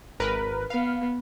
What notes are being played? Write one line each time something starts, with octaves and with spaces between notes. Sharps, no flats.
G#1 A#4 B4
B3 F5